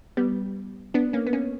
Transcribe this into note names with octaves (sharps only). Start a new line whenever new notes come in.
G3 B3
B3 D4
A#3 C#4
B3
A#3 C#4